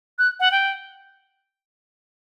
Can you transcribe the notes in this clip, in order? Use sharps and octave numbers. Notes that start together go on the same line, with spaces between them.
F#6
F#5
G5